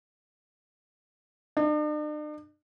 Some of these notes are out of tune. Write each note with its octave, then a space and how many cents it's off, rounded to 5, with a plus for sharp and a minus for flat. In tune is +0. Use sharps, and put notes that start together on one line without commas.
D4 +45